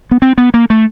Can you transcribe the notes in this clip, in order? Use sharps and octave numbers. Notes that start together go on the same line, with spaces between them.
B3
C4
B3
A#3
A3